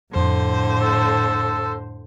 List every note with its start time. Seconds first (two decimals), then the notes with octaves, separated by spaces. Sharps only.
0.13 F2 A2 D3 C5 C6
0.82 A4